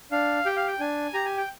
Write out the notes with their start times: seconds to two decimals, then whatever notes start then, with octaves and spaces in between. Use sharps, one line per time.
0.12 D4 F5
0.46 G4 G5
0.56 F5
0.67 G5
0.80 D4 G#5
1.14 G4 A#5
1.25 G#5
1.37 G5